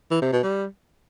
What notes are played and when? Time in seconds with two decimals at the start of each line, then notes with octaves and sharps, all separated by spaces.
0.11 E3
0.22 C3
0.32 B2
0.43 G3